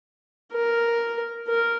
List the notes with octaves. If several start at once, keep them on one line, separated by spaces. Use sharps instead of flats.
A#4
A#4